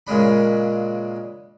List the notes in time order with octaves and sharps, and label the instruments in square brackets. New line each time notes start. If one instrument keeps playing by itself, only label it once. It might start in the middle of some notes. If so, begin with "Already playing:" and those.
[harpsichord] A#2 C#3 G#3 D4 B5